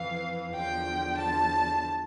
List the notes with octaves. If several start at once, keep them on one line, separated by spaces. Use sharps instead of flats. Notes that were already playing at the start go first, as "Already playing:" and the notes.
Already playing: F2 E3 F5
E2 D3 F3 G5
A5